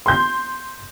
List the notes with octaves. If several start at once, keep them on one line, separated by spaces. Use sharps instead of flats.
C6 G6